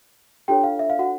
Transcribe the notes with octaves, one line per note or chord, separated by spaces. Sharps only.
D4 F4 G4 A4 C#5 G5
F5
E5
F5
F#4 F#5